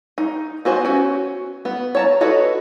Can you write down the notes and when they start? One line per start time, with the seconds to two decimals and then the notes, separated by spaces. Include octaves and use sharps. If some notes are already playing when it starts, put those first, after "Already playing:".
0.18 D#4
0.65 B3 F#4 C5 G#5
0.85 C#4 F#4
1.65 B3
1.95 C#5 A5 A#5
2.21 F#4 A4 B4 C#5 D#5